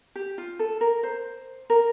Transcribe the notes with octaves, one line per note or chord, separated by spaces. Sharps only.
G4
F4
A4
A#4
C5
A#4